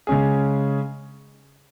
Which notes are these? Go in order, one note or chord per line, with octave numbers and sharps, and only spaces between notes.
C#3 G#3 C#4 G#4